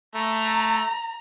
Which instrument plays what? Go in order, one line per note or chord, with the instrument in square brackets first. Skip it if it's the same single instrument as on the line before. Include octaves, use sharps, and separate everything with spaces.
[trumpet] A3 [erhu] A#5